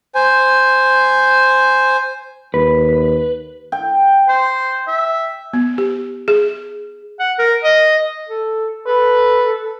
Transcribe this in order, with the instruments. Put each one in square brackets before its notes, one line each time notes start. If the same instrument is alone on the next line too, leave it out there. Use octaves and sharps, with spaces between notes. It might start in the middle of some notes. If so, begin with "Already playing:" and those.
[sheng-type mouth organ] C5 G#5
[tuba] D#2 [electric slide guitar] B4
[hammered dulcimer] G5
[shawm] C5
E5
[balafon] B3
G4
G#4
[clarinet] F#5
A#4
D#5
[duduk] A4
[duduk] A4 [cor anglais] B4